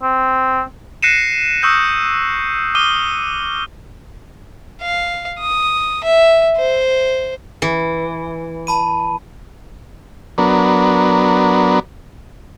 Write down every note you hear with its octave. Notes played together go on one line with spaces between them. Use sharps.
C4
F#6 A#6 C7 C#7 D#7 E7
C#6 D#6 E6 F#6 G6 E7
D6 D#6 F6 D#7 G7
F5
D#6
E5
C5
E3
A5 B5 D#7
F#3 B3 D4 A#4